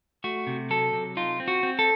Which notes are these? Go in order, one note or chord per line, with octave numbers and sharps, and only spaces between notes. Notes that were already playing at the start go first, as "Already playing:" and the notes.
A3 F#4
C3
F#3 A4
C3
D#4 F4
C4
F#4
C4
A4